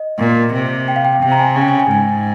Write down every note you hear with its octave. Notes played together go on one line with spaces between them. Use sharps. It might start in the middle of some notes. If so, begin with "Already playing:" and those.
Already playing: D#5
A#2
C3
G5
F5
G5
C3 G5
A#5
G#5
C#3
G5
G#5
G#5
G#2 G#5